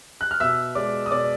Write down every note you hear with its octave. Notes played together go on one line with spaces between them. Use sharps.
F#6
F6
B2 E5 E6
G#3 D5 D6
D#6
B2 D5 D6